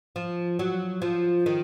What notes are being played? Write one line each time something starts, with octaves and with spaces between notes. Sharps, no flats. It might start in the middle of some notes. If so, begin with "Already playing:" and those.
F3
F#3
F3
D#3